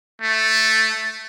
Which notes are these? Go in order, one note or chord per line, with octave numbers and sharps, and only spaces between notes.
A3